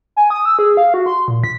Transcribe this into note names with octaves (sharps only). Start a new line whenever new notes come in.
G#5
D#6
E6
G#4
F5
F#4
C6
A#2
B6